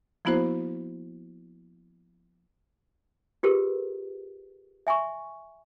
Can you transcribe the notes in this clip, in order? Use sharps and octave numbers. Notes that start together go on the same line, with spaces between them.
F3 A#3 B3 E4 F#4 C5
F4 G4 G#4 A#4 B4
E5 G#5 C6 C#6